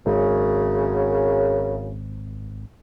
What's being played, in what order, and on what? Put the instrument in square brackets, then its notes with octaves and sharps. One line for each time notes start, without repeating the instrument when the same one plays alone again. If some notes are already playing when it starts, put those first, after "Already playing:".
[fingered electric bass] G#1 [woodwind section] F#2 C#3